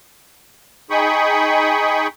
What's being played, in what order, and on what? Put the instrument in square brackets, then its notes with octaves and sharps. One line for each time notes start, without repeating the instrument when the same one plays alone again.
[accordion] D#4 G#4 G5 B5 C#6 D#6